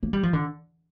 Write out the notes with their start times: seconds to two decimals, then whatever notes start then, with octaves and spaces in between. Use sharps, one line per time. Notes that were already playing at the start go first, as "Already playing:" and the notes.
0.03 A#3
0.13 G3
0.23 F3
0.33 D3